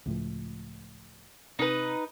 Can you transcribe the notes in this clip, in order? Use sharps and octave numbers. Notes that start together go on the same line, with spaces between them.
C#2 A2 F3
C3 D#4 B4